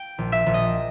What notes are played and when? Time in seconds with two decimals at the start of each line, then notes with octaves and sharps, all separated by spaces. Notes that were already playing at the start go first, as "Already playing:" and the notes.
Already playing: G5
0.18 A#1
0.32 E5
0.46 A#1
0.54 D#5